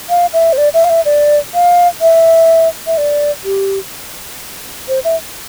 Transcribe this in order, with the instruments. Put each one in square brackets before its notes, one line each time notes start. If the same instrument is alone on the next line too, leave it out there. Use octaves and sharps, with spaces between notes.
[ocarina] F5
E5
C5
D5
E5
F5
E5
D5
F5
E5
E5
D5
G4
C5
E5